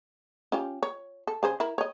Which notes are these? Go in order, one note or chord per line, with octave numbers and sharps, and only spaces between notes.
C#4 F4 G4
C#5
A4
C#3 G#4 C5
E4 A#4
C#5 D#5